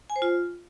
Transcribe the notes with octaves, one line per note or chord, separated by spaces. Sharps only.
G#5
C5
F4